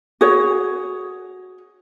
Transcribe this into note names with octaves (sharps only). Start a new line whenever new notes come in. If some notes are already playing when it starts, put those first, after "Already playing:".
F#4 G#4 C#5